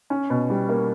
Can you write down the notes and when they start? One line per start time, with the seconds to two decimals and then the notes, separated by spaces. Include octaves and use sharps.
0.10 C#4
0.30 B2
0.50 G3
0.69 A#3